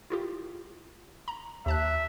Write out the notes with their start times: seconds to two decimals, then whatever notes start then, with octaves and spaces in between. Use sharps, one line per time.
0.10 E4 F4 G4
1.28 A#5
1.66 D#2 E5 A5 F#6